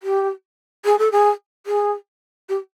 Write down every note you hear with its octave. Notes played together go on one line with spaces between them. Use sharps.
G4
G#4
A4
G#4
G#4
G4